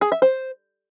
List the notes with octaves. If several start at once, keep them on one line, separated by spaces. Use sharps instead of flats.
G#4
E5
C5